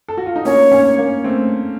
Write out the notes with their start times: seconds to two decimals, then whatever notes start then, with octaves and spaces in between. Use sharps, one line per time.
0.09 A4
0.17 F#4
0.26 F4
0.36 D#4
0.45 A#3 C#4 C#5
0.72 A#3 C#4
0.99 A#3
1.24 A3 C4